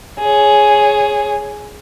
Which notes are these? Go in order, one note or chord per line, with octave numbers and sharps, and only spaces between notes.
G#4 C#5